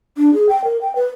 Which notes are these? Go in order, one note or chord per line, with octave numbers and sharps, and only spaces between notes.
D4
G#4
G5
A#4
G5
B4